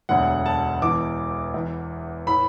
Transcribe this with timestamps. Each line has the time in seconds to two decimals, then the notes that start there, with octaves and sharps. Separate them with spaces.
0.09 E1 D2 D3 F#3 F#5
0.46 A5
0.81 E1 E2 E3 D6
1.54 E2 E3
2.27 A2 E3 B5